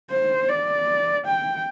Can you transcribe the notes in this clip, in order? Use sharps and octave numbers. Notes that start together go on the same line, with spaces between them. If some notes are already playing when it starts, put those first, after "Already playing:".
C5
D5
G5